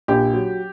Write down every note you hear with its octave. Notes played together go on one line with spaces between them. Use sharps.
A#1 G4
F#3